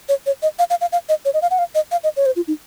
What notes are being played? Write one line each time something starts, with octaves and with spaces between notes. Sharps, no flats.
C#5
C#5
D#5
F5
F5
F5
F5
D#5
C#5
D#5
F5
F#5
F5
D#5
F5
D#5
C#5
C5
F4
D#4